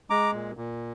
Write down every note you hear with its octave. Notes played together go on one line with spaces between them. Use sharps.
G#3 A#5 D6
A#2
A#2